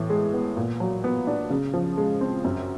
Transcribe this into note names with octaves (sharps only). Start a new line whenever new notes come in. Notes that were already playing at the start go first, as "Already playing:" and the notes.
Already playing: A2 E3
G#3
B3
A#2
F#3
B3
D4
C#3
F3
G#3
C4
F#2